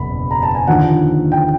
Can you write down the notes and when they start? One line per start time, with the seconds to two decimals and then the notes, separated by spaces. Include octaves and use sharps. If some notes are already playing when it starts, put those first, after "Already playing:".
Already playing: F#1 E2 B2 B5
0.31 A#5
0.43 A5
0.55 G#5
0.68 D#2 D3 F3 F#5
1.32 G5